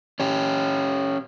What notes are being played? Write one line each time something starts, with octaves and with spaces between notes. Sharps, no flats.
C#4 G4